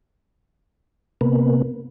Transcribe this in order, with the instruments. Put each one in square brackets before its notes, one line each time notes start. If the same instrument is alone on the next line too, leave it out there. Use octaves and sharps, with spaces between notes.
[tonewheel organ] C3 A#3 B3